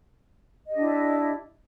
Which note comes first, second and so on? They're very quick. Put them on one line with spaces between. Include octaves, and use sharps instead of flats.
D#5 G4 D4 E4